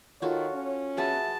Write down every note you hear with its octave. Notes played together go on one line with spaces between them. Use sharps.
D#3 F4 F#4 A4 C#5
C#4
F#4 G#4 B4 E5 A5